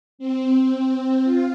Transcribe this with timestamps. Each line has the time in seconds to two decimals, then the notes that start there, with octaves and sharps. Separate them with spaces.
0.19 C4
1.24 F4